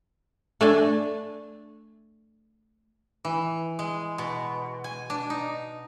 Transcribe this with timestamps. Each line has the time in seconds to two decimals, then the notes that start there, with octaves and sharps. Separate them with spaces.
0.61 A3 D4 G#5
3.25 E3
3.79 G#3
4.18 B2
4.84 G#5
5.10 D4
5.30 D#4